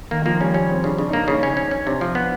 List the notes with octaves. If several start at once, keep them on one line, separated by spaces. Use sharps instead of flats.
D#3 A#3
F3 A#3
G3 C#4
G3 C#4
C#3 C4
C#3 D4
C#3 D4
D#4
A#3 D4
C#3 D4
C#4
C#4
C#4
C3 D4
F3
B3